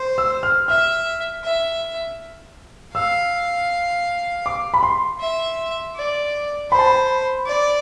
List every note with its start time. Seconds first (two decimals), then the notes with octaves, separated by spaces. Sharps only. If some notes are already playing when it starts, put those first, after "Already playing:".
Already playing: C5
0.18 E6
0.43 F6
0.68 E5 F6
1.44 E5
2.94 F5 E6
4.46 D6
4.74 B5
4.83 C6
5.20 E5
5.96 D5
6.71 C5 B5
6.79 A5
6.87 B5
7.46 D5